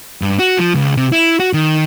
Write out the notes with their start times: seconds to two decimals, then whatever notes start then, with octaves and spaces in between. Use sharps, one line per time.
0.22 G2
0.39 F#4
0.58 F3
0.75 C#2
0.97 C3
1.12 E4
1.40 F#4
1.53 D#3